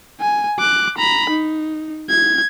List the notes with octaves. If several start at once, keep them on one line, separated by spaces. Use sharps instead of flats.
G#5
D6 F#6
A#5 B5
D#4
G#6